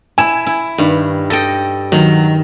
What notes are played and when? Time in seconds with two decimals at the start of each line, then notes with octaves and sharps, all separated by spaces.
0.18 E4 G#5 E7
0.47 E4
0.78 G2 D#3
1.30 A4 D#5 G5 A#6
1.92 D#3 F#3